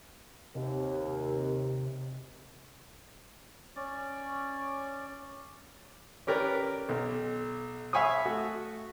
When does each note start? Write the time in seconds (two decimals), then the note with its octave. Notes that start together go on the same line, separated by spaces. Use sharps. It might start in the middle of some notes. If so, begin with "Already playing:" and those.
0.55 D#2 C3
3.76 C#4 D5
6.27 C#4 G4 A#4 B4 D5
6.89 B1
7.93 E5 F5 G#5 B5 C#6 D#6
8.26 A3 F#4